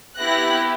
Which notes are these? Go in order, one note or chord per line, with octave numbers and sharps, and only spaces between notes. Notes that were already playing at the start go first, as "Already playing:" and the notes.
B3 E4 G4 F#6 A#6